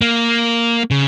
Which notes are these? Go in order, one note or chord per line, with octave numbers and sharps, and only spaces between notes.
A#3
C#3